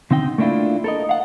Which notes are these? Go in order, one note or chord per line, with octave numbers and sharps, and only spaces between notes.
D3 C4 D#4 G5
A3 A#3 D4 E4 F4
A4 A#4 D#5
F5 F#5